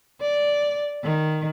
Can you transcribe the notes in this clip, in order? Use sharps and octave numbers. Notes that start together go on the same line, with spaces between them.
D5
D#3